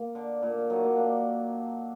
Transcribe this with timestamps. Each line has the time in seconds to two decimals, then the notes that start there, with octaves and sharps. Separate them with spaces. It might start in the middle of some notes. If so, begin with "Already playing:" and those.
Already playing: A#3
0.15 D3
0.42 A#2
0.70 D#3 F#3
0.83 F#3 A#3
0.96 A#3 D4